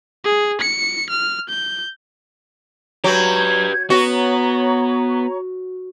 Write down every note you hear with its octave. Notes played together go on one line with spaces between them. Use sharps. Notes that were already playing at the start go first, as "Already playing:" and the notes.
G#4
C#7
F6
G6
F#3 G4 B4 G6 G#6
B3 F#4 C#5 A#5 C#6